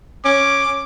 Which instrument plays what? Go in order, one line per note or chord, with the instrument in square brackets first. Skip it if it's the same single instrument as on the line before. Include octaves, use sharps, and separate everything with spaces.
[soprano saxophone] C#4 [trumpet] D6